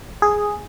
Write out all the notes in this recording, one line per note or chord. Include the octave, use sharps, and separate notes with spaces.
G#4